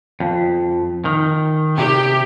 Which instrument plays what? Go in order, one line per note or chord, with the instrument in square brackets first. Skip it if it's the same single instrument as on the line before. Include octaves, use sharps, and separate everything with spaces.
[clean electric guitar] F2
D#3
[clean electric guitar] C3 [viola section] G4